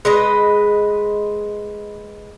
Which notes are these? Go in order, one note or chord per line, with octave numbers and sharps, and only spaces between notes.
G#3 B4 D#5